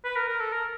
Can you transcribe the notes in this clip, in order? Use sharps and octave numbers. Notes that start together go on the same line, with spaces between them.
B4
A#4
A#4
A4
A#4